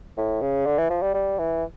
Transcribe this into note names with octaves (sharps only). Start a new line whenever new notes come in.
A2
C#3
D3
E3
F3
G3
G3
E3